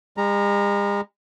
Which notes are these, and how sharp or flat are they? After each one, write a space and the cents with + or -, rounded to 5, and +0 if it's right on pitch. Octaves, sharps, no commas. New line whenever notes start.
G#3 -45 A#5 +0